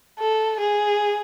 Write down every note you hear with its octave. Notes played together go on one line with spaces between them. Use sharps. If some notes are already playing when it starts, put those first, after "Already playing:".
A4
G#4